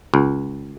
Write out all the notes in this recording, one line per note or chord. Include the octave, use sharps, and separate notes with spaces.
C#2